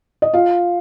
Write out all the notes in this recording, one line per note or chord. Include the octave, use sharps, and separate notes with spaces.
D#5
F4 F5